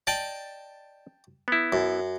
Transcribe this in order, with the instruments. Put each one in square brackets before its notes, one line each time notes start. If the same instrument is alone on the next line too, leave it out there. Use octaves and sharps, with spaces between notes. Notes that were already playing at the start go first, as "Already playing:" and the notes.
[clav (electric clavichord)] D5 D#5 [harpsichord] G5 A5
[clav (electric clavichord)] B3 E4
[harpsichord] F#2